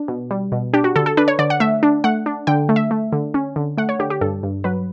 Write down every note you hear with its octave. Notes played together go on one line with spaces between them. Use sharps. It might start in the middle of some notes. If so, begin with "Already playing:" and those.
Already playing: D4
B2
G3
B2
D4 G4
F#4
D3 A4
A4
D4 B4
C#5
D3 D5
F#5
A3 E5
D4
A3 F#5
D4
D3 G5
A3
E5
A3
D3
C#4
D3
A3 F#5
C#5
D3 G4
G4
G2 A4
G2
F#3 B4